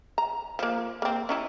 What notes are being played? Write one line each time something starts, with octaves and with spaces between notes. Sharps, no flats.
A#5
F3 A#3
A#3 C4
C#4 D#4 E4